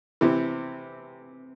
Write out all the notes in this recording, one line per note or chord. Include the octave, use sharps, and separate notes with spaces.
C3 E3